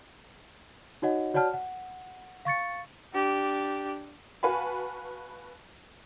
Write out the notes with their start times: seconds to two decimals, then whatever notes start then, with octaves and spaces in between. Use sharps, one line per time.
1.02 D#4 F#4 C#5 D#5 F#5
1.34 F#4 C#5 D5 F#5 A5 F6
1.53 F#5
2.45 F5 C#6 A6 C#7
3.13 D4 G4
4.43 F#4 B4 F5 G#5 A5 B5